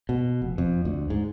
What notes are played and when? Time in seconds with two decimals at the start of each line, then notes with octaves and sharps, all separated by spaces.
0.09 B2
0.42 F1
0.58 F2
0.85 D2
1.10 G#2